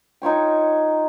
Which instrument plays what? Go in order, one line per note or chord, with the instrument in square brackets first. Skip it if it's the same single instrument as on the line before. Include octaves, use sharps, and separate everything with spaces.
[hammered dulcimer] D#4 F4 C#5 G5